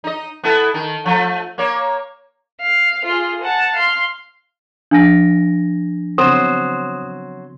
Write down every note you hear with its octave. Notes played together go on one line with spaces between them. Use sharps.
D#4 D#5
B3 E4 A4
D#3
F3 A3
A#3 C#5
F5
F4 G#4
F#5 A5
F5 C6
F3 D4 G#5 A#6
C#3 F#3 B3 C4 C5 D#6